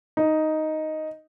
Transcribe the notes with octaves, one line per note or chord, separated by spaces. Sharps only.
D#4